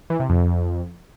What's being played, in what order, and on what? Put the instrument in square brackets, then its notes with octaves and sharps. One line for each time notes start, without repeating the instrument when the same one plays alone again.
[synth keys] E3
C3
F2